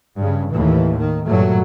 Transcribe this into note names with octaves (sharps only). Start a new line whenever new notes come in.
G2 C#3
D#2 A2 E3
D#3
G2 A#2 F#3 A3